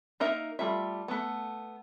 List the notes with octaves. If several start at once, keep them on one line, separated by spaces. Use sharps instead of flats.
A#3 D#4 A#4 E5
G3 A3 F4 E5
A3 B3